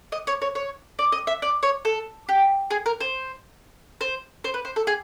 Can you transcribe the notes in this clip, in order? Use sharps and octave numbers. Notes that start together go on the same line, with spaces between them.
D#5
C#5
C#5
C#5
D5
D#5
E5
D5
C#5
A4
G4
G#4
A#4
C5
C5
C5
B4
C5
A4
G#4